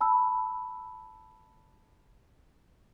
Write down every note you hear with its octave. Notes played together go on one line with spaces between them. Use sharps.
A5 B5 E6